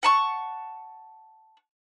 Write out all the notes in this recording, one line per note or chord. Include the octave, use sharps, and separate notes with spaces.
F#5 A5 C#6